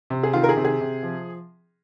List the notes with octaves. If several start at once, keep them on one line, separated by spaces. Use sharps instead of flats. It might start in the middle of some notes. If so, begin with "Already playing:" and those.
C3
G#4
D#3 F4
A#4
G#4
C3
G#4
C3
F3